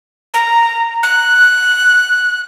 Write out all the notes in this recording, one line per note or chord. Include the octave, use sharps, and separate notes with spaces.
A#5
F#6